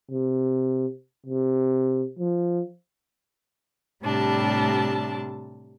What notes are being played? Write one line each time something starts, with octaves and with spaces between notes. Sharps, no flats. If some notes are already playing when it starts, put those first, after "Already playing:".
C3
C3
F3
A2 C3 G3 D4 A5